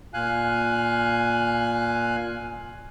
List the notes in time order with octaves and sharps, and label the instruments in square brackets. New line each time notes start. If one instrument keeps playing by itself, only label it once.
[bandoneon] A#2 F5 G#5 F#6